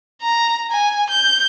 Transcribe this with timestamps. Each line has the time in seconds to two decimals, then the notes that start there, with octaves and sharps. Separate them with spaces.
0.22 A#5
0.71 G#5
1.10 G6